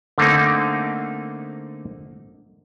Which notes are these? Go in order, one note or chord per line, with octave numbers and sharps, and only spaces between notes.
D3 A3 A#3 C4 D#4